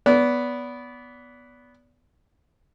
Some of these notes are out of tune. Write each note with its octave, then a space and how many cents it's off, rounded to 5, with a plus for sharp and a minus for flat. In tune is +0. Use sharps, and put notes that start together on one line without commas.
B3 +0 D5 -30